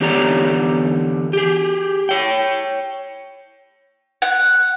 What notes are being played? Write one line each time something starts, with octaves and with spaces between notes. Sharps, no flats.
E2 D3 G4 C#5 D5 A#5
G4 G#4
C#5 G5
F#5